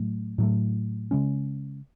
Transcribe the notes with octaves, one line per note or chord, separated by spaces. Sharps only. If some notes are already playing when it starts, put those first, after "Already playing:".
Already playing: A2 F#3 A3
A2 F#3 A3
C#3 G#3 C#4